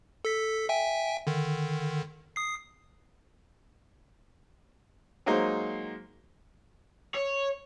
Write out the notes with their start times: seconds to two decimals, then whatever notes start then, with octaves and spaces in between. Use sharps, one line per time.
0.25 A4 B6
0.69 E5 G5 G#5
1.27 D3 D#3
2.36 D#6 C7
5.26 F#3 G#3 A#3 D#4 C5
7.15 C#5